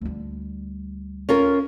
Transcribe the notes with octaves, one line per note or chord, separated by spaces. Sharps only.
D2 G3
C#4 F4 A#4